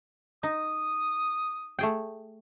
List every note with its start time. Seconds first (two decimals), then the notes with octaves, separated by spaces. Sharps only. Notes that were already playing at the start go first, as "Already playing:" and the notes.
0.43 D#4 D#6
1.79 A3 G#4 G5